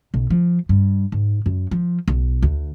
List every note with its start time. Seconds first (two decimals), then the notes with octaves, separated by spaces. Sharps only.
0.14 B1
0.30 F3
0.69 G2
1.12 G#2
1.46 F#2
1.71 F3
2.08 B1
2.42 D2